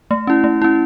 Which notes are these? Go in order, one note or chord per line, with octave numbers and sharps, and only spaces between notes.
A3
C#4 E4
A3
C#4 E4